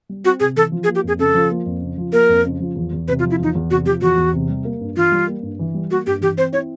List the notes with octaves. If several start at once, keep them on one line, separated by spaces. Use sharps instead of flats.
G3
C4 F#4
C3 G#4
E3 A4
F3
G#4
A#3
G4
F2 G#4
C#3 A4
F3
A#3
F2
C#3
F3
A#3 A#4
F2
C#3
F3
E2
E2
C3 B4
F4
F3
E4
E2 D#4
E2
C3 F#4
F3 G4
E2 F#4
E2
C3
G3
A#3
G2
E3 F4
G3
A#3
G2
E3
G3
A#3 F#4
G2 G4
E3 G4
C4 C5
E4 C#5